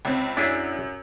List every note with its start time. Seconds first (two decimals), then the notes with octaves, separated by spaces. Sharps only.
0.05 C#2 C4
0.37 F#2 D4 E4 G#4